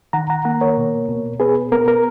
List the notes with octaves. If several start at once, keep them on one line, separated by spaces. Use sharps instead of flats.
D#3 F#5 A#5
F#5 A#5
A#3 F#5 A#5
A#4 C#5
B2
B2
B3 G#4 B4
B3 A#4
A#4